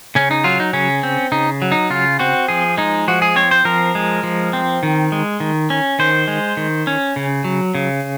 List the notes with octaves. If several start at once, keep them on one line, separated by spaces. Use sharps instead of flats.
C#3 C#4
D#4
F#3 F4
D#4
C#3 C#4
C4
C#3 D#4
F#3
D#4
C#3 F4
C4 F#4
F3 G#4
G#3 D#4
F3 F#4
G#4
C4 C#5
C5
F3 A#4
G#3
F3
C4
D#3
G#3
D#3
C#4
D#3 C5
G#3
D#3
C#4
C#3
F#3
C#3